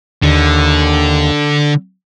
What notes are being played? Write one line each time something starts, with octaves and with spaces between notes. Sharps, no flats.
D#2 D3